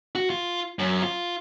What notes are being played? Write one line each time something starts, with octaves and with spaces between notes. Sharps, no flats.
F#4
F4
F#2
F4